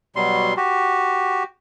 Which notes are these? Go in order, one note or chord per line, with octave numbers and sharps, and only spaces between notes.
B2 F#3 G3 C6
F#4 G4